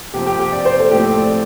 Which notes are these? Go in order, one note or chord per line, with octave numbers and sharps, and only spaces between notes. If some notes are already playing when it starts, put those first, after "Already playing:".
C3 F3 C4 G4
G4
G4
D5
C5
A4
A2 F3 C4 G4
A4
D5